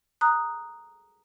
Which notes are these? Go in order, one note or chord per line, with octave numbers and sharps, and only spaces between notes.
A#5 D#6 F#6